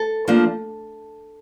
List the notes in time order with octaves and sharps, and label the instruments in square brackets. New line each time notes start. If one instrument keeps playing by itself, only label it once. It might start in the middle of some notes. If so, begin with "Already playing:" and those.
Already playing: [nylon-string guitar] A4
F3 A#3 D4